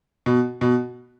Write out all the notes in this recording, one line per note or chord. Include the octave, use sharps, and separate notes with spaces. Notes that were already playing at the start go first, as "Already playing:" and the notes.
B2
B2